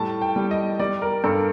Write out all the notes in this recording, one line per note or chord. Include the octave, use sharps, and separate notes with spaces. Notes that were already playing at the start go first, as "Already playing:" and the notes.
Already playing: A2 G3 A5
G5
G3
D#5
G3 D5
A#4
G2 A4